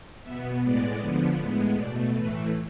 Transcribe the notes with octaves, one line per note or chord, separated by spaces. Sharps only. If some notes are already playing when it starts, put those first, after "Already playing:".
B2 B3 E5
A2 G#3 B3 D5
D3 F3 B3
A2 G#3 B3
B2 A3 D5
A2 E3 A3 B4